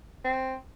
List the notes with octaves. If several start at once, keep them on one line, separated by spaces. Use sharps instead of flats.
C4